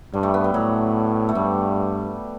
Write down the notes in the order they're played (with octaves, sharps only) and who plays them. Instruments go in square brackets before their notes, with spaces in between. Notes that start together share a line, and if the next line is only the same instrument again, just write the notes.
[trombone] G2 [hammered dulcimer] G3
[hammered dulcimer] A3
B3
G3
[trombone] A2 [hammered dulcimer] F#3
[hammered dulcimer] A3
[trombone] G2 [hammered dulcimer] G3